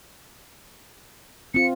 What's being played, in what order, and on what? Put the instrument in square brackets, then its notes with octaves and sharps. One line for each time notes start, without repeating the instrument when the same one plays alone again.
[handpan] C4 F4 [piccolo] C#7